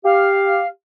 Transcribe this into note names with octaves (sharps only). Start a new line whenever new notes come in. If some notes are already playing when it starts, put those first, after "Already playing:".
G4 F5